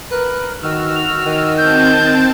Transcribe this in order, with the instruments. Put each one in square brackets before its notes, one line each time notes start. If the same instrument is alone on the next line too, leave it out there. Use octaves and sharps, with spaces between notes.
[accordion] A#4 [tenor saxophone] B4
[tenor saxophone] D#3 [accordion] F#4 E6 F6
[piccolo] F7
[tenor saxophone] D#3
[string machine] C4 A5 [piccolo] G6